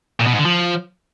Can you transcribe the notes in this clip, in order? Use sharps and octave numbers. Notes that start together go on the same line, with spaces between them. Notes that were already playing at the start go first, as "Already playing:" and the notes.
A#2
B2
G#2
D3
F3